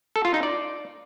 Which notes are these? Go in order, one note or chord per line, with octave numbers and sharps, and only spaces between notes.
A4
F4
D#4
D5